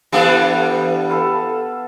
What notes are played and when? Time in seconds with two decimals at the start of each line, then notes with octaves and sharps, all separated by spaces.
0.12 E3 G3 B3 D4 A4
1.09 A4 B4 F5